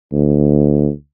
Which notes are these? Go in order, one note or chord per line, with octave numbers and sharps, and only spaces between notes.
D2